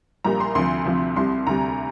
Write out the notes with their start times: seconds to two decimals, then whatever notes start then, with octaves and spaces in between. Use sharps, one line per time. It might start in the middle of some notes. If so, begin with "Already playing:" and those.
0.24 A#1 A#2 G3 A#5
0.40 C6
0.55 D2 C3 F3 C6
0.86 D2 C3 F3
1.16 C2 C3 G3 C6
1.47 D2 C3 G3 A#5